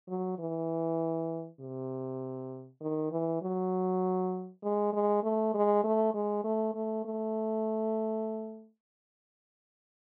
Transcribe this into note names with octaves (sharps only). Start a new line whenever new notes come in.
F#3
E3
C3
D#3
E3
F#3
G#3
G#3
A3
G#3
A3
G#3
A3
A3
A3